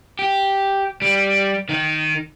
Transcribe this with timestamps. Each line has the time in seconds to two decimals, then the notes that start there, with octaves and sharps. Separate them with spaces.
0.19 G4
1.02 G3
1.69 D#3 D#4